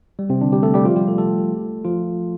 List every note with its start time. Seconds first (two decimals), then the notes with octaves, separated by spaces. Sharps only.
0.19 G3
0.30 C3 C4
0.41 D3 D4
0.52 G3 G4
0.63 A3 A4
0.74 G3 G4
0.85 F3 F4
0.96 G3 G4
1.07 A3 A4
1.18 A3 A4
1.85 F3 F4